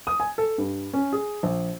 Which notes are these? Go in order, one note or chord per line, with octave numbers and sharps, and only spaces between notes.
D#6
G#5
A4
G2
C#4
G#4
A#1